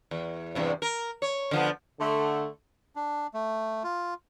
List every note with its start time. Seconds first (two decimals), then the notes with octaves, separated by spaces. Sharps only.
0.11 E2
0.55 E2 G2 C3
0.82 A#4
1.22 C#5
1.51 D3 F3 B3
1.99 D3 A3
2.96 D4
3.34 A3
3.84 F4